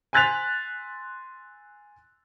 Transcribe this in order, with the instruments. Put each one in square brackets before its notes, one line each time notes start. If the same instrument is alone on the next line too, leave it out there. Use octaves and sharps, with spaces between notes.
[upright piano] G#5 C6 F#6 A6 B6 F7